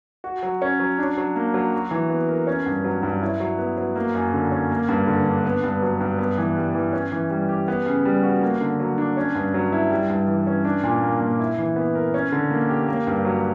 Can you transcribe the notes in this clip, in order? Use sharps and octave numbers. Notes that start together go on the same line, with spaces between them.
F#4
F#3
C#4
F#3
D4
F#3
A#3
F#3
F#4
E3
B3
A#4
C#4
G2
F#3
G2
E4
F#3
B3
F#3
A#3
F#2
D3
C#4
A#3
G2
D3
D4
B3
G2
F#3
G2
B3
E3
G3
E3
C#4
E3
G3
G4
B3
C#3
G3
F#4
A#3
D3
F#3
D4
C#4
G2
F#3
E4
G3
G2
E3
C#4
D4
A#2
A#3
A#2
E4
E3
B3
A#4
C#4
D3
A#3
G4
A#3
G2
F#3